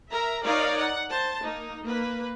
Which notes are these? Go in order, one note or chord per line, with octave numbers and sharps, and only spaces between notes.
A#4 E5 A#5
D#4 A#4 C#5 D5 F5
F#5
C5 A5
A#3 D#4
A#3 B4